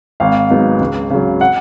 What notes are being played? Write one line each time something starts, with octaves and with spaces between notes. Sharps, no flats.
G#1 F5
G#2 F#3 B3 D#4
C#2
C#3 F#3
F#5